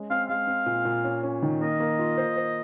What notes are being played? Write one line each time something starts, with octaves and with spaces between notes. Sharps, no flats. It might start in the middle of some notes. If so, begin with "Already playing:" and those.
Already playing: G#3 C#4
C4 F5
G#3 F5
C4
A#2
A#2
C#4
C#4
D#3
A#3 D#5
A#3
F4
C5
C5